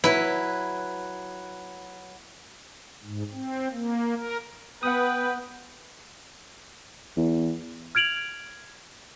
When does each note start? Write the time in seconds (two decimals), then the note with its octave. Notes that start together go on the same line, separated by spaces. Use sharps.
0.04 F#3 E4 B4
3.03 G#2
3.33 C4
3.72 A#3
4.17 A#4
4.83 B3 B4 F#5 G5 D#6
7.17 E2
7.95 F6 G#6 D7 F7 F#7